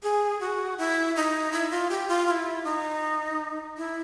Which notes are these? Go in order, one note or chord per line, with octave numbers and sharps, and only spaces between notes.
G#4
F#4
E4
D#4
E4
F4
G4
F4
F4
E4
D#4
E4